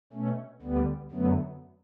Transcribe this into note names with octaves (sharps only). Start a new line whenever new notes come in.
B2 A3 C#4
D2 D3 G3 B3
F#2 D3 F#3 A3 B3